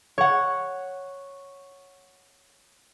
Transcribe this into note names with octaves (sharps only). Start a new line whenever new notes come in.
C#5 F#5